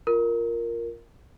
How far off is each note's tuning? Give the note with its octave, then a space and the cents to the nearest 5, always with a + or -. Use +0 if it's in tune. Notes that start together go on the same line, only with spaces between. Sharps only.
F4 +0 A#4 +0